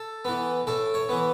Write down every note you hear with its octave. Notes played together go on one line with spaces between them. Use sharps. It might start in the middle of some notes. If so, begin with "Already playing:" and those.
Already playing: A4
E3 B3
A2 A4
C#5
E3 B3